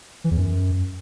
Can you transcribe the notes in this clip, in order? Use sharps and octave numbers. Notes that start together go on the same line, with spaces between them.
E3
E2
F#2